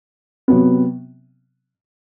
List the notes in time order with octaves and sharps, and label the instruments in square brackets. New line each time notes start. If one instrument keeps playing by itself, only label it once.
[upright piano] C3 F#3 B3